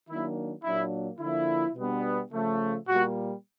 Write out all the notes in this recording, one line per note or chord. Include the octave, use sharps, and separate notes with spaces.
D#3 F#3 A#3 D4 E4
A#2 F#3 A#3 D4 E4
D3 F3 A#3 E4
B2 G3 B3 D4
C#3 F3 A3
A#2 G3 A#3 F#4